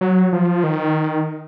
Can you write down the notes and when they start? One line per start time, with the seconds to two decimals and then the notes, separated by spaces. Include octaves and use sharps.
0.01 F#3
0.33 F3
0.64 D#3